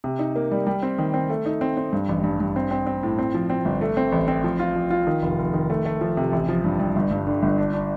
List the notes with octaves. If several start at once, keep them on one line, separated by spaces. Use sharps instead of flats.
C3
D#4
A#3
G3
G3
C4
D#3
C4
A3
D#4
C4
C4
G2
A1
G2
G2
C4
C4
C4
A2
C4
F3
C4
G1
A3
C4
A1
C4
F3
F4
F3
F4
D#3
F1
F1
D#3
A3
A3
F3
C3
A1
F3
G2
G2
G1
G2
D3
G1
D4
D4